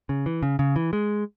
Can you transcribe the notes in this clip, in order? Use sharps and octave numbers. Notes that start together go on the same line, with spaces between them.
C#3
E3
C#3
C#3
E3
G#3